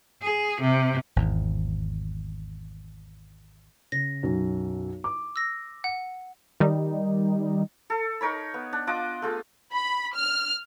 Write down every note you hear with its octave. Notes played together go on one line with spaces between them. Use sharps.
G#4
C3
G#1 E2
C#3 A#6
B1 F#2
D6
E6 A#6
F#5
D#3 G3 D#4
A4
D#4 A#4 C#5 B5
B3
D4
D4 F4 D#5 D6
A3 F4 G#4
B5
F6